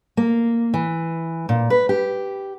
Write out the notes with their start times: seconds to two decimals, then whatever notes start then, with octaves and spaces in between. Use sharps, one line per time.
0.17 A#3
0.74 E3
1.49 A#2
1.70 B4
1.89 G4